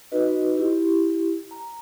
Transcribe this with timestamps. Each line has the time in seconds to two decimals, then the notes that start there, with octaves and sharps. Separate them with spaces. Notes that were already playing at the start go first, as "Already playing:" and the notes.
0.12 D#4 F#4 B4 D#5
0.57 E4 G4
1.51 A#5